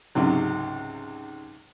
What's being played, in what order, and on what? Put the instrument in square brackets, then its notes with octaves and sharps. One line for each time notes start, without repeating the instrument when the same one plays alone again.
[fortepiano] C#2 G#2 C3 F#3